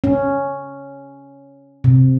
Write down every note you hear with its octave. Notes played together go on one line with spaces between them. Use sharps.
C#4
C3